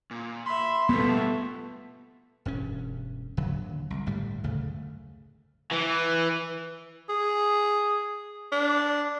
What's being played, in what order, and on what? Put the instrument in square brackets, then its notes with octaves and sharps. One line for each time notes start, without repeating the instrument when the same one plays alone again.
[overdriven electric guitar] A#2
[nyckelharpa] E5 B5 [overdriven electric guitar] C6
[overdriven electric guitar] G2 F3 [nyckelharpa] A3 E5 [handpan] B3
[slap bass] E1 G2 C#4
D#1 D3 F#3
C2
G1 A2 G3
F#1 D2 C#3 A3
[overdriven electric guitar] E3
[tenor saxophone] G#4
D4